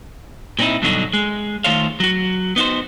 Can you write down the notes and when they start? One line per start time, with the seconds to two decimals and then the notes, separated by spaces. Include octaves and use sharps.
0.59 A#2 C4 C#4 D#4 E4
0.82 G2 B2 D3 F#3 D#4 F#4
1.13 G#3
1.64 D#3 A3 F4 C5 C#5 F5
2.00 F#3 F#4
2.56 B3 D#4 F#4 C5